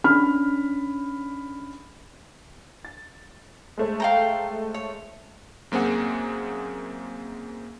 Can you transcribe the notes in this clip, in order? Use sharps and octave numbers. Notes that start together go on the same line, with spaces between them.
C#4 D4 B5 F6
A6
G#3 A3 C5
F5 G5 A#5
C#5
F#2 A#3 C4 G#4 F#5